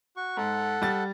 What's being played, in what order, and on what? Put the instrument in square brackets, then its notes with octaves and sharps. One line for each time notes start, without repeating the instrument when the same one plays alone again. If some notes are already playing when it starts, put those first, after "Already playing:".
[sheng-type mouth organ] F#4 C#6
[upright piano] G#2 [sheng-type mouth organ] A4 F#5
[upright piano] G3 A6